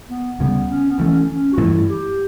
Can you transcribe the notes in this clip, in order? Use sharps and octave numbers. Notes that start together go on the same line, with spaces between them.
B3
D2 C#3 E3 G3 B3
C#4
B3
G2 E3 A3 C#4
C#4
F#4
G2 E3 A3 E4
G4